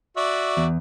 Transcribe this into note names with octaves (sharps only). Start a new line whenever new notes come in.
F#4 D5 E5
E2